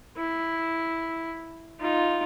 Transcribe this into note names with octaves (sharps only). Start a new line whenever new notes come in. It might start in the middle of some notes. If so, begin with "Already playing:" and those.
E4
D#4 F4